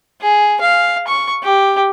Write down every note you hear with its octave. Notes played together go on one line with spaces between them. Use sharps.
G#4
F5
C#6
G4